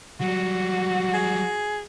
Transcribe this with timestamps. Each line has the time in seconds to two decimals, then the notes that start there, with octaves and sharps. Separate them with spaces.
0.21 F#3 G3 F#4
1.14 G#4